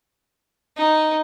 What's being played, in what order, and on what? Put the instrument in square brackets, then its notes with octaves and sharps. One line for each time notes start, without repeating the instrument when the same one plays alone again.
[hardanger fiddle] D#4